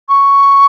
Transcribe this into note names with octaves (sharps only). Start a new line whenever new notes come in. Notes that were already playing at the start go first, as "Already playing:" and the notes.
C#6